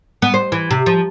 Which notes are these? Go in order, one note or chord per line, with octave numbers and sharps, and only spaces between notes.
B3
C5
E3
C3
F3